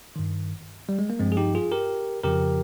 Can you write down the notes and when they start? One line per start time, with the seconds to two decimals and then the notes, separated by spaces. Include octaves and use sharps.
0.16 G2 D#3
0.89 G3
0.99 G#3
1.10 A#3
1.20 G2 F3 G#3 C4
1.32 G#4
1.37 D#4 G4
1.55 F4 G#4
1.72 G4 A#4
2.23 F2 C#3 F3 G4 A#4